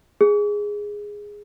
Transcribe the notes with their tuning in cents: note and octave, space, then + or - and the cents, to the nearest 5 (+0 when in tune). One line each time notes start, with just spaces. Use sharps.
G#4 -5